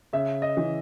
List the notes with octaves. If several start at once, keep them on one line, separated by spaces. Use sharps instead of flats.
C#3 E5
D#5
E3